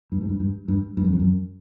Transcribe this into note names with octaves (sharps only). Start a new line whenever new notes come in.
G2
G#2
G2
G2
G2
G2
F#2
F2
F#2